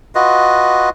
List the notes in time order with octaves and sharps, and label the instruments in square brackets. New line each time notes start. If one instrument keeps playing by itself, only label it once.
[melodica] F4 F#4 B4 D#5